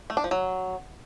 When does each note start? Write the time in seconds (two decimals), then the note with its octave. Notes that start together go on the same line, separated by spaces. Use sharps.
0.10 A3
0.17 D4
0.24 F3
0.31 F#3